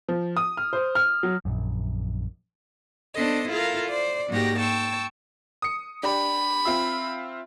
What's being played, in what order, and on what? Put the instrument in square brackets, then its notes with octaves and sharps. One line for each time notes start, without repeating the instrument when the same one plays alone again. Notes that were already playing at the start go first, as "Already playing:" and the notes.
[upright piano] F3
D#6
F6
C5
F6
F#3
[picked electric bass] A#1 F#2
[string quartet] B3 D4 A4 C5 D#5
E4 F4 A4 A#4 F5
C5 D5
G#2 A#3 F#4 G4 G5 A#6
G5 A5 C#6 E6
[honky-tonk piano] D#6 C#7
[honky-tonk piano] D4 G4 [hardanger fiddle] B5
[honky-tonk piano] C4 F4 E5